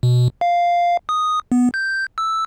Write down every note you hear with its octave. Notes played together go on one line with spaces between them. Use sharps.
B2
F5
D#6
B3
G6
E6